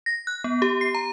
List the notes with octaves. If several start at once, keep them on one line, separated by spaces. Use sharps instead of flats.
A#6
F#6
B3
G4
C7
A#5